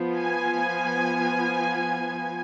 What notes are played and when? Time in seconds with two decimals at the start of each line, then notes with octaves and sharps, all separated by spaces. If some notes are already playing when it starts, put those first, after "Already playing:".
Already playing: F3 B3
0.18 G#5